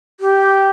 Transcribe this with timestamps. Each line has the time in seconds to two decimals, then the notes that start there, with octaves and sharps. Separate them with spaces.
0.20 G4